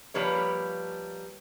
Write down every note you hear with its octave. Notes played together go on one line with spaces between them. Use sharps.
F3 G3 A#3 B4 C#5